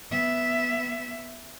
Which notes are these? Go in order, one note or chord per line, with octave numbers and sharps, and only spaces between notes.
B3 E5